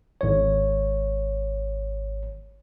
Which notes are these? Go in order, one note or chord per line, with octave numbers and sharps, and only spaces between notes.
G#1 C#5